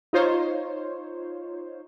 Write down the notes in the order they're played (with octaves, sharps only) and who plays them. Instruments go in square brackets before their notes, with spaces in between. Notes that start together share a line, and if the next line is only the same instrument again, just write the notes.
[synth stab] D#4 F4 C5 C#5